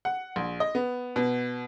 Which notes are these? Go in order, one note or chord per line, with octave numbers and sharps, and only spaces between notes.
F#5
A#1
D#5
B3
B2